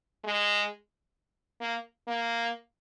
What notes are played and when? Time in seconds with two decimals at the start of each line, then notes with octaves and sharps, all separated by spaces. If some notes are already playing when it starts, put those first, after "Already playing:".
0.24 G#3
1.61 A#3
2.08 A#3